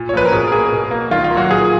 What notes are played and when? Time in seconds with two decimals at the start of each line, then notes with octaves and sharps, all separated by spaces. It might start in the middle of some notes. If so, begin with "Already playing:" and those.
Already playing: A#2
0.09 C#5
0.13 F3 A#3 B4
0.25 A#4
0.32 B2 G#4
0.47 A#4
0.52 A#3 G#4
0.72 B2
0.91 A#3
1.11 D#3 F4
1.24 F4
1.30 A#3
1.35 F#3 F#4
1.51 A#2 G#4